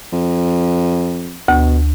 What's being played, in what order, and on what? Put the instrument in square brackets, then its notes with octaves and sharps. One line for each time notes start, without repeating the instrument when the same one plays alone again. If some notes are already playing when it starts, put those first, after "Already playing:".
[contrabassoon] F2
[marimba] D2 [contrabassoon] B2